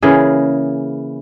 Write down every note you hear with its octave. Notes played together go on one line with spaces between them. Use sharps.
C#3 E3 A#3 G#4